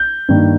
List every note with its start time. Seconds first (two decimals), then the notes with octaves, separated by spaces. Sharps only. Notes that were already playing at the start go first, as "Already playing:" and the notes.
Already playing: G6
0.29 G2 D#3 A#3